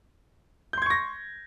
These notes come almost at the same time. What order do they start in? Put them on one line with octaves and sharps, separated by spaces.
G6 C6 G#6 C#6 A#6